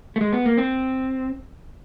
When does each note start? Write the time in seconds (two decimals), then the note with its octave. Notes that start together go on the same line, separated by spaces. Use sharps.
0.16 A3
0.21 G#3
0.33 B3
0.46 A#3
0.58 C4